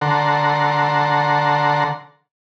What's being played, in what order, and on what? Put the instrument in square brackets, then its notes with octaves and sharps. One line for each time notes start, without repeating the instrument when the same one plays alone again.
[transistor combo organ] D3 A4 F#5 A#5 C6